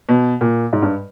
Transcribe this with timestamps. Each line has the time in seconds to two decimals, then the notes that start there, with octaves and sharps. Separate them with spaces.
0.09 B2
0.41 A#2
0.73 G#2
0.82 G2